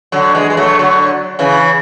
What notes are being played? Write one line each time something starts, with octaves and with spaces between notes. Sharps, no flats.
D3 F#3
E3 G#3
G#3
F#3 A3
D3 F#3
C#3 E3